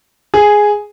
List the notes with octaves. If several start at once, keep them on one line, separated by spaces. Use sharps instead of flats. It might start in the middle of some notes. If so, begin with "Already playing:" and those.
G#4